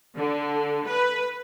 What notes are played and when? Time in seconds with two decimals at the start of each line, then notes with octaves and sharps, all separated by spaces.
0.17 D3
0.86 B4